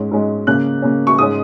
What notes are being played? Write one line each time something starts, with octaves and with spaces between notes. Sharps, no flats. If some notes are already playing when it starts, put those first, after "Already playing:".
Already playing: G#2 G#3 C#4
G#2 G#3 C#4
C#3 A#3 C#4 F#6
C#3 A#3 C#4
C#6
G#2 G#3 C#4 D#6